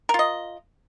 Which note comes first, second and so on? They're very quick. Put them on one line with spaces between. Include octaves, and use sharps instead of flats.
A#4 F4 D#5